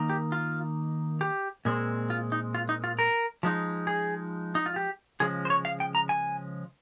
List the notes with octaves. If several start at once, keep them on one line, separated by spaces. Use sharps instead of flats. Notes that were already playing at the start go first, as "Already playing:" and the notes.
Already playing: D#3 A#3 D#4
G4
F4
G4
A#2 G#3 C4
F4
D#4
F4
D#4
F4
A#4
F3 G#3 D#4
G#4
D#4
F4
G4
C#3 F3 G#3 G#4
C5
C#5
F5
G5
A#5
G#5